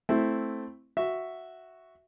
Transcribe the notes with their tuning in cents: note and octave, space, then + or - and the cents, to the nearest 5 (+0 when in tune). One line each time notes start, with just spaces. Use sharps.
A3 +0 C4 +0 E4 +0
F#4 +0 E5 +0